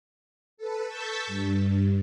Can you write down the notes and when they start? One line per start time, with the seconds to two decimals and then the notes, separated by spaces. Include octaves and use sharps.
0.57 A4 B4
0.87 A5 C#6 E6 G6 A6 B6
1.27 G2